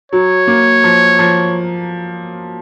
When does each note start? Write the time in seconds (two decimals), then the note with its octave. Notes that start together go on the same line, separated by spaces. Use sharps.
0.12 F#3 C#5
0.47 A#3
0.84 F3
1.19 F3